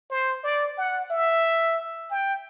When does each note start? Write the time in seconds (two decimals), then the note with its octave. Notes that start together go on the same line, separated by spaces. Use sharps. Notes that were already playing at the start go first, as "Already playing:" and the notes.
0.10 C5
0.44 D5
0.78 F#5
1.10 E5
2.11 G5